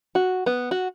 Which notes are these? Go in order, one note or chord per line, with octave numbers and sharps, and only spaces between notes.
F#4
B3
F#4